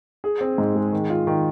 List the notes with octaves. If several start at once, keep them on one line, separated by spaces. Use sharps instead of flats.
G#4
C4
G#2
G#3
D#3
F4
D#3